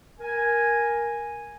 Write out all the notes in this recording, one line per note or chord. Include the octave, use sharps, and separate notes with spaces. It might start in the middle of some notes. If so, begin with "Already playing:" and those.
A#4 G#5